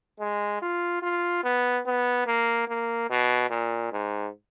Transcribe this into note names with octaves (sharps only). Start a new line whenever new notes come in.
G#3
F4
F4
B3
B3
A#3
A#3
B2
A#2
G#2